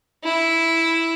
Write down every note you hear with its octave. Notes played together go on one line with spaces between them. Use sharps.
E4